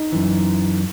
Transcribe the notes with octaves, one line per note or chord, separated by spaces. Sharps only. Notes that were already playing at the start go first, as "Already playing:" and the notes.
Already playing: D#4
F#2 E3